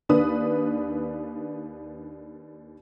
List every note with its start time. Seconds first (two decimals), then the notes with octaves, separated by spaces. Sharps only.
0.09 D#2 D4 B4 D#6